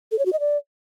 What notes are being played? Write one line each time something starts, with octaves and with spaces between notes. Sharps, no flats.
A4
C#5
F#4
D#5
D5